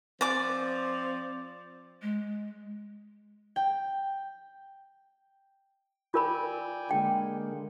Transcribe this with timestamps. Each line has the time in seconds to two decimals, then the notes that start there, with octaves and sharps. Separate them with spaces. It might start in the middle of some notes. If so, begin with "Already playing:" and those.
0.21 F3 C4 D5 D6
2.02 G#3
3.56 G5
6.14 F4 A#4 D5 G5 G#5 B5
6.91 D3 G#3 A#3 G5